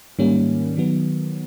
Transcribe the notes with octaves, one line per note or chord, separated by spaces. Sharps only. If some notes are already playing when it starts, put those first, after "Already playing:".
G#2 D#3 G3 A#3 C#4
D#3 F#3 B3